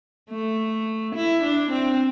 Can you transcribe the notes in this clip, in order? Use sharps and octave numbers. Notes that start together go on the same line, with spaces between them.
A3
E4
D4
C4